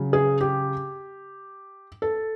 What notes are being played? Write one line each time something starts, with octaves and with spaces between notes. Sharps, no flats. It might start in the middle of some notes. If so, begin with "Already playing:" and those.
Already playing: C#3 F#3
G#4
G4
A4